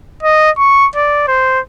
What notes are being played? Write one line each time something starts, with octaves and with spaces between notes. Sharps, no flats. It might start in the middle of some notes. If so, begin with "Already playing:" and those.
D#5
C#6
D5
C5